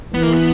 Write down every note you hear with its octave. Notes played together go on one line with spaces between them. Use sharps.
E3 B3
A#3
B3